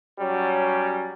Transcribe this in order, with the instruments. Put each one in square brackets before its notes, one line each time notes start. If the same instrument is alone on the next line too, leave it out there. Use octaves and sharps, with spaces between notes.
[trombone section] F#3 G3 C#4